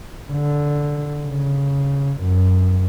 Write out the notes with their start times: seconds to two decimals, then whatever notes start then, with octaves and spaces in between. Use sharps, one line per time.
0.32 D3
1.26 C#3
2.21 F#2